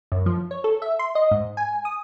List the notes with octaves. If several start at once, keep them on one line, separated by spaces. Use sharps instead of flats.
F#2
F3
C#5
A4
E5
C6
D#5
G#2
G#5
D#6